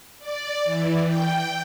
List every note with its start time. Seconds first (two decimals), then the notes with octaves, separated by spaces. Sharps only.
0.19 D5
0.64 E3
1.04 G5